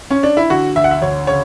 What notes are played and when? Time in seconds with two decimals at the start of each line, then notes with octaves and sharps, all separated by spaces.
0.11 C#4
0.23 D4
0.37 E4
0.50 D3 F#4
0.76 D2 E5
0.84 F#5
0.91 E5
1.02 D2 C#5
1.27 C#3 C#5